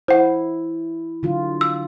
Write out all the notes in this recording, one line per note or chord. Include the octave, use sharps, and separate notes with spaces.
E4 C5 F#5
D3 F#3 F4
E6